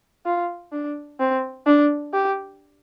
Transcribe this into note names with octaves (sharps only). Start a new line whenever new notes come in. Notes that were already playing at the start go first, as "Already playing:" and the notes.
F4
D4
C4
D4
G4